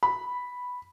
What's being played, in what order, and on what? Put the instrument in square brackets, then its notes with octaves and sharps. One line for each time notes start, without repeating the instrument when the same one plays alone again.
[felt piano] B5